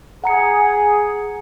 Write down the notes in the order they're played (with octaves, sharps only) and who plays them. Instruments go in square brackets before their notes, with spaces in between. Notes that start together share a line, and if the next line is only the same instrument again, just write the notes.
[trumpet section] G#4 [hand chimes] F#5 A#5 C#7